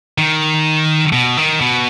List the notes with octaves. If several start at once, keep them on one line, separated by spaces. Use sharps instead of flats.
D#3
B2
D#3
B2